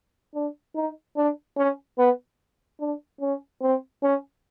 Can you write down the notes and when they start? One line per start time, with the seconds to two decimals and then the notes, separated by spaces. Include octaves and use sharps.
0.34 D4
0.75 D#4
1.16 D4
1.57 C#4
1.98 B3
2.80 D4
3.21 C#4
3.62 C4
4.03 C#4